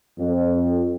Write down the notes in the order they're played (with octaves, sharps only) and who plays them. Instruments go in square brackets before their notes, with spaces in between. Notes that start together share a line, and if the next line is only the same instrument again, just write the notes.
[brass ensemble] F2